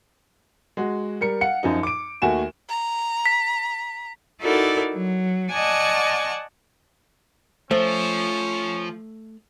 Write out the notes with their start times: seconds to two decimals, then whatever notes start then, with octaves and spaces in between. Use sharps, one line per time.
0.77 G#3 F#4
1.21 G3 A#4 C#7
1.41 F5 F#5 C#7
1.63 F#2 F3 D#4
1.83 D6 D7
2.22 D#2 A3 F#4 G#5 E7
2.69 A#5
3.26 B6
4.41 D#4 E4 F#4 A4 A#4 D5
4.94 F#3
5.52 D5 D#5 F#5 G#5 A5 C#6
7.71 F3 A3 C#4 C5